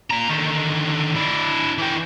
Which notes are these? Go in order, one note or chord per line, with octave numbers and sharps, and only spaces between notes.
A#2 A#5
D3 D#3
D4 E4
E3 G5